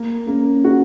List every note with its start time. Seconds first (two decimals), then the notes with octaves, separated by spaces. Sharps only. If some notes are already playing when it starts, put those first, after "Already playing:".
Already playing: A#3
0.27 A#3 C#4
0.64 F#4